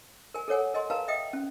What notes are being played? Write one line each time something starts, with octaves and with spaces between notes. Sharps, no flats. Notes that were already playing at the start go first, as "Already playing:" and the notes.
A#4 G#5
A4 A#4 C#5 F#5 G#5
A#4 D#5 G#5 C6
A#4 B4 F5 A5 A#5
D#5 E5 G5 D#6
C#4